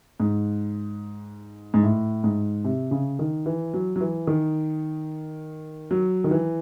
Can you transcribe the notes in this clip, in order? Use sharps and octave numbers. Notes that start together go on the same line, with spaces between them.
G#2
G#2
A2
G#2
C3
C#3
D#3
E3
F#3
F#3
E3
D#3
F#3
D#3
E3